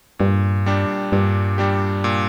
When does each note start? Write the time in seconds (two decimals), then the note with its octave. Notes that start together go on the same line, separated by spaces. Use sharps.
0.19 G2 A#2
0.66 G3 D4 G4
1.12 G2 A#2
1.58 G3 D4 G4
2.04 A#2